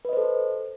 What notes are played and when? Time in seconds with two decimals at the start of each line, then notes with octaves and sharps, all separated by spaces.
0.05 B4
0.09 D#5
0.13 C5
0.17 A4